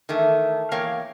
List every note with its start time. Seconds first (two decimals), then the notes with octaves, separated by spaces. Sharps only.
0.09 D#3 E3 A3
0.72 E2 A#3 A#4 C#5 F5 G5